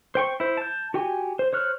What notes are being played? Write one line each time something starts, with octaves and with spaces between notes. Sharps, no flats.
C5 G5 C#6
E4 C5
A5 G6
F#4 G4 G5 G#5
C5
C5 C#5 F6 F#6